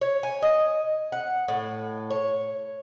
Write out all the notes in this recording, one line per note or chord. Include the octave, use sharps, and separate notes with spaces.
C#5
G#5
D#5
F#5
A2
C#5